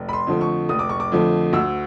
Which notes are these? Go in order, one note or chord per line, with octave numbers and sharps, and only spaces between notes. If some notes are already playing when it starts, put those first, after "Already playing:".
Already playing: F1
B5
C6
F2 D3 F3 A3
C#6
F1 D#6
D6
C#6
D6
F2 D3 F3 A3
D2 E6